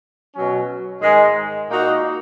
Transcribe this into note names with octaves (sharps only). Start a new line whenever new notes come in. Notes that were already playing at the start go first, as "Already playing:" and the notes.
B2 F#3 C#4
G#2 D#3 G#3
A#2 A#3 D#4 F#4